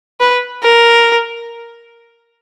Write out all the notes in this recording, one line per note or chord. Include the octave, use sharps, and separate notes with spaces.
B4
A#4